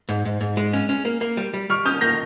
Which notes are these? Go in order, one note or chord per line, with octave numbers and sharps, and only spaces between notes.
G#2
G#2
G#2
G#3
C#4
C#4
A#3
A#3
G3
G3
G3 C#6 F6
C#4 D#6 G6
A#3 G6 A#6